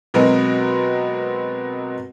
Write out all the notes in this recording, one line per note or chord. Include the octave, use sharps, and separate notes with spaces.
B2 F#3 G#3 B3 C4 A#4